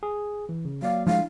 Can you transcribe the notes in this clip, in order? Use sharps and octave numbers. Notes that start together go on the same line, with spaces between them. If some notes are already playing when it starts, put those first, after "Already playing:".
G#4
E3
C#3
F#3 A#3 D5 F5
F3 G#3 D4 E4 F5